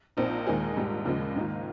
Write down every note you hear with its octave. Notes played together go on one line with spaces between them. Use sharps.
A#1 A#2 F3 C4 D#4
D#2 D#3 G#3 D#4 G#4
A#1 G#2 G3
D#2 C#3 F3 G#3
G#2 D#3 A#3 F4